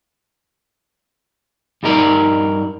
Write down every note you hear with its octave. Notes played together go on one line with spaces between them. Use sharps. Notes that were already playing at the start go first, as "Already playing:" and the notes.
G2 G3 D#4 A#4 D5